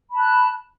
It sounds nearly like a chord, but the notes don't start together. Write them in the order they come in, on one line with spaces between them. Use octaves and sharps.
B5 A5 F#6